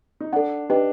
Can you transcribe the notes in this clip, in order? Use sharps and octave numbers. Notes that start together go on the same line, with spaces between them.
D#4
D4 A4 D5 F#5
D4 D#4 G4 B4 D#5 G5